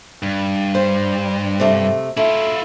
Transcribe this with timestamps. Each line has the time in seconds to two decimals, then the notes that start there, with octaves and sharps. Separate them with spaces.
0.23 G2
0.75 C5
1.60 C3 A3
2.17 A3 E4 F4